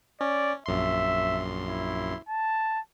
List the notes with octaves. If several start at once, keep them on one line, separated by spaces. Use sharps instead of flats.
C#4 D5
A#1 F#2 E5 C6
E4
A5